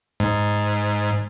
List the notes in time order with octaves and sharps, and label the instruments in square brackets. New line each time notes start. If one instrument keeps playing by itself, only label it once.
[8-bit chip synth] G#2